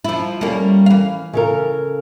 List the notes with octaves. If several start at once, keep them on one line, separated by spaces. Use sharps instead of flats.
F3 E4
G3 A3 A#3 C#4
E3 F5
C#3 A4 A#4